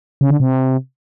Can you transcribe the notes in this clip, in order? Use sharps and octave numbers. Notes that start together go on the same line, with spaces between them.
C#3
D3
C3